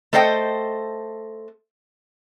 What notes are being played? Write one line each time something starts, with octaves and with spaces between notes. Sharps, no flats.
A3 A4 C5 D#5 F#5 G5